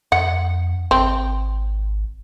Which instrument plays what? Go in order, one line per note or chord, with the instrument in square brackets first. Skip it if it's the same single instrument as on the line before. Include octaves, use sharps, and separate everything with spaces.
[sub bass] F2 [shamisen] F#5
[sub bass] G#1 [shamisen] C4